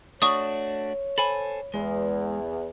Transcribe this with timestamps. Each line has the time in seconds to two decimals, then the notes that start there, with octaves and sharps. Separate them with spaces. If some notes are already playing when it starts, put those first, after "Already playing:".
0.22 A3 D4 F#4 C#5 C#6 D#6
1.18 A4 C5 G#5 B5
1.74 E2 G#3